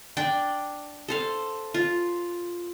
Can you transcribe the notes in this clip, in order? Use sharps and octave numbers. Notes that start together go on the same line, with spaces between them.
D4 D5 G5
A4 C5 F5
F4